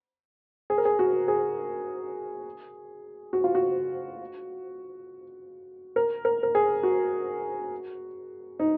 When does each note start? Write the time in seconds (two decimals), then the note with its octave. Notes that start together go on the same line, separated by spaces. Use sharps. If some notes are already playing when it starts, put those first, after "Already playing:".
0.70 G#4
0.78 A#4
0.85 G#4
0.99 F#4
1.28 G#4
3.33 F#4
3.44 F4
3.55 F#4
5.96 A#4
6.25 A#4
6.43 A#4
6.55 G#4
6.83 F#4
8.59 D#4